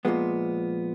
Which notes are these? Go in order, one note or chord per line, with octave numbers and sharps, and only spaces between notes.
A#2 F3 G#3 B3